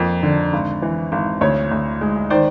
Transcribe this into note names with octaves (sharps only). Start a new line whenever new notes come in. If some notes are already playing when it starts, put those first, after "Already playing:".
Already playing: F2 A#3
D3
G#1
E3
G#1
D2 C#5
D2
G#3
D#3 C5 D5